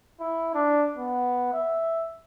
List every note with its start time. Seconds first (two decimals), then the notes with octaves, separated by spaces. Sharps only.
0.20 E4
0.54 D4
0.97 B3
1.53 E5